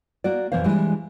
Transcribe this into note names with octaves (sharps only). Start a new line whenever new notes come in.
A#3 F#4 D5
F2 B2 E3 A#3 C5 F5
E3 G3 G#3 D4